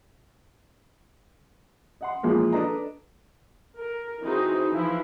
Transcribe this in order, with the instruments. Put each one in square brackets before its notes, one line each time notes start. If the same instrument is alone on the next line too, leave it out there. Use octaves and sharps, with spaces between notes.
[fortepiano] D#5 F#5 C6
A#2 E3 F3 G#3 A#3
D4 A4 B4 D#5 A#5
[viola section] A#4
E3 C4 D#4 F#4 G#4 C5
E3 F3 E4 E5